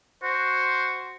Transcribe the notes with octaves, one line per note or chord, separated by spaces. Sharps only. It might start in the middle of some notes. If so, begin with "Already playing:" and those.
F#4 C5